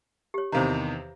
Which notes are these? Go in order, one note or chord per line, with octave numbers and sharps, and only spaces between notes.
G4 C#5
E2 C3 D#3 C5 F5 A#5